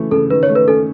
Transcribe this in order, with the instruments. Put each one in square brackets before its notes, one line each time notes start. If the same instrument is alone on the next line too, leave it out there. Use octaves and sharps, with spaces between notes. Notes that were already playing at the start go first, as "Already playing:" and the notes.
Already playing: [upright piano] C#3 E3 A3
[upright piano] C#3 [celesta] A4
[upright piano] D#3 [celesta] B4
[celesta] C#5
[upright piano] A3
[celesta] B4
[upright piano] C#4 [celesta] A4